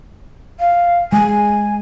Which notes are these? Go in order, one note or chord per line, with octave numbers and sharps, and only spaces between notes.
F5
G#3 G#5